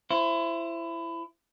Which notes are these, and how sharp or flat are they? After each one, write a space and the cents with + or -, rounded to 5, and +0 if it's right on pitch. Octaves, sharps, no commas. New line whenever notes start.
E4 +25 C5 +0